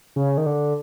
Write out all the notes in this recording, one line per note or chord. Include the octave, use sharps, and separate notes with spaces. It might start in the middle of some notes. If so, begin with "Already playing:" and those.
C#3
D#3
D3